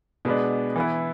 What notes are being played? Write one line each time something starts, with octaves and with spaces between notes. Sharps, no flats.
B2 G#3 B3 D4
E3 B3 E4